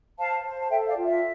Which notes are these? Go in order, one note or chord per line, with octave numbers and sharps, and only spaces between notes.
C5 F5 A5
C5
A5
A4 E5 G5
D5 F5
F4
E5